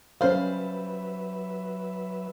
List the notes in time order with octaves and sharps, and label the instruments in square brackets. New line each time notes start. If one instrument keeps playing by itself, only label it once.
[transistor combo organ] F#3 B4 E5 [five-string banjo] G3 C5 [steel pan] C#4 F5